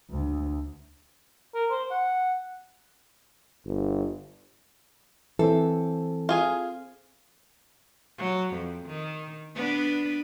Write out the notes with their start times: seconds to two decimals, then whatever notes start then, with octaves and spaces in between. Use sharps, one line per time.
0.11 D2
1.54 A#4
1.71 C5
1.91 F#5
3.65 G1
5.39 E3 C4 A4
6.29 F4 G#4 G#5
8.18 F#3
8.54 F2
8.86 D#3
9.55 B3 D4 B4